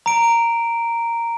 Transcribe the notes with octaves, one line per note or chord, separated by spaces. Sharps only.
A#5 D7